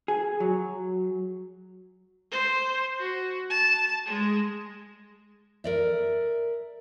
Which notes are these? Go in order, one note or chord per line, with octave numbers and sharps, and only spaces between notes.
G#4
F#3
C5
F#4
A5
G#3
A#4 D5 E5